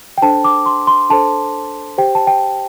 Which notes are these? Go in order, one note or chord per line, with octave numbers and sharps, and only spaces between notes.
G5
D4 A4 C5 A5
D6
C6
C6
D4 A4 C5 A5
G4 C5 G5
A5
G5